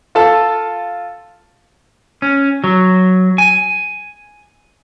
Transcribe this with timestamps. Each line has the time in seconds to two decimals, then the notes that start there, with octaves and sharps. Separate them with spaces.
0.15 F4 A4
2.22 C#4
2.64 F#3
3.38 G#5